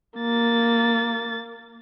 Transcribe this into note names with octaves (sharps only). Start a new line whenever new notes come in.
A#3 A6